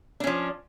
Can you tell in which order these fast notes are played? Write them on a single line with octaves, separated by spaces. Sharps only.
D4 C#4 F3